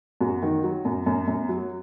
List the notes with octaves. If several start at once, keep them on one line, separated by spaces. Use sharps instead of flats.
F#2 F#4
D#3
F#3
F#2
F#2
F#2
F#3